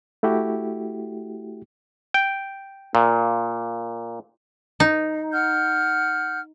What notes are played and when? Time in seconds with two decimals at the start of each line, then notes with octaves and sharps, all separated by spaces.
0.23 A3 E4 F#4 G4
2.14 G5
2.95 A#2
4.80 D#4
5.32 F#5 F6 G6